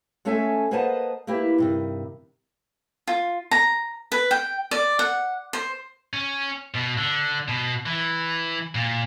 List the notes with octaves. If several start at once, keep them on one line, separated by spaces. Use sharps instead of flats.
G#3 A3 C#4 A4 E5 G#5
A#3 B4 C5 D#5 F#5 A5
A#3 E4 G4 B4 E5
G2 C3 D#3
F4
A#5
B4
G5
D5
F#5
C5
C#4
B2
D3
B2
E3
A#2